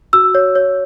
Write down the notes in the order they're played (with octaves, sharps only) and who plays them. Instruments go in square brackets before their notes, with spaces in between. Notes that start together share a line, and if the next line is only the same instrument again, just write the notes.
[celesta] F#4 E6
C#5
C#5